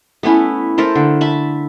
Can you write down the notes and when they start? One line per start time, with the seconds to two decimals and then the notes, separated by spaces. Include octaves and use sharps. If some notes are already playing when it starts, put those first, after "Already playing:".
0.23 A3 B3 C#4 E4
0.78 A3 A4 A#4 C5
0.95 D3
1.21 E5 A5 B5